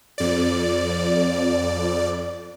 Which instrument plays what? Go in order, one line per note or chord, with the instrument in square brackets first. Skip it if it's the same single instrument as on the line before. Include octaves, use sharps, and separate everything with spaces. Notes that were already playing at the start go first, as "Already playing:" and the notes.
[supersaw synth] F2 D5